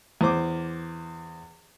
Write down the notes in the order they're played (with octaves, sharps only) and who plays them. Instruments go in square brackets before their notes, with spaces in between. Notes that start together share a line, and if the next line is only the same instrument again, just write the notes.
[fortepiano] E2 C5 D6